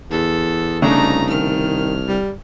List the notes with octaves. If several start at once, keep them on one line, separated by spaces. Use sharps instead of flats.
E2 A4
C2 C#3 A3 D4 D#4 A#5
D#3 F6
G3